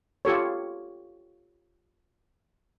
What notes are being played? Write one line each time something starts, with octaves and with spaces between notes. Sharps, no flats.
F4 G4 A4 C#5